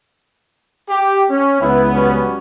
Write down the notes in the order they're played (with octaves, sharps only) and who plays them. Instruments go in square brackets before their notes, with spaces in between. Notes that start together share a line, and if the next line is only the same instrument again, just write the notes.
[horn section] G4
C#4
[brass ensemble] C#2 B3 [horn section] E4
[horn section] F#3 G3 C#4